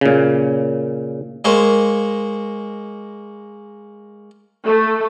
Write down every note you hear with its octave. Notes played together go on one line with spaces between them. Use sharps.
A#2 C#3
G#3 A#3 C5 C#5
A3